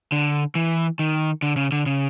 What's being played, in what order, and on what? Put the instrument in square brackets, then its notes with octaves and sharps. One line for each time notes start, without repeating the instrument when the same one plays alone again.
[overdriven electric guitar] D3
E3
D#3
D3
C#3
D3
C#3